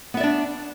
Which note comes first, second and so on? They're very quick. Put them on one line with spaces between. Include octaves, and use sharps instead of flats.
B3 E5 D5 D4